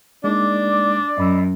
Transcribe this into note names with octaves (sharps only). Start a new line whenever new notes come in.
G#3 A#3 D4 D#4 D5
F#2 D#5 B5 E6